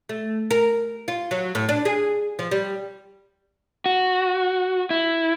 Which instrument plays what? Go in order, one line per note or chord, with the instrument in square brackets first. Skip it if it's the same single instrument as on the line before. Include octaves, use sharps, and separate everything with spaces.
[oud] A3
A#4
F4
F#3
A2
D4
G#4
F3
G3
[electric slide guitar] F#4
E4